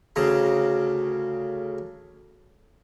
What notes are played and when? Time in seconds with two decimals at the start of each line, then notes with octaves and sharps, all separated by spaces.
0.16 D2 C#3 A#5